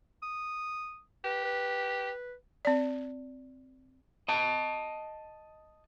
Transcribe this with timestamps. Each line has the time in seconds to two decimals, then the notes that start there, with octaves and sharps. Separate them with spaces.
0.22 D#6
1.25 G4 B4
1.45 B4
2.65 C4 D5
4.28 D#5 A5